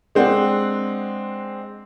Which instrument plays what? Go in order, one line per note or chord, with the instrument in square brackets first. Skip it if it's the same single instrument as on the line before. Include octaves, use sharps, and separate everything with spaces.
[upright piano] G#3 C4 D4 F#5